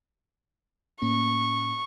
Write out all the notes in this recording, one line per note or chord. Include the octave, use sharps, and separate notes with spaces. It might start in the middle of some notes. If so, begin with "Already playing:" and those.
A2 A#3 C#4 C#6